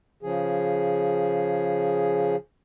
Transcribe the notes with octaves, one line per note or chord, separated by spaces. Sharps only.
C#3 F3 G#4